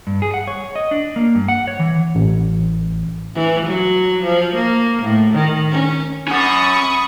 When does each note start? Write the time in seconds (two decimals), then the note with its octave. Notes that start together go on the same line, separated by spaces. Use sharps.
0.07 G2
0.22 G#4
0.34 F#5
0.47 C#5
0.76 D#5
0.91 D4
1.16 A#3
1.35 G2
1.48 F#5
1.68 C#5
1.79 E3
2.15 A1
3.35 E3
3.66 F#3
4.23 F3
4.55 A#3
5.02 A2
5.34 D#3
5.71 C#4
6.28 C#4 F#5 B5 C#6 D#6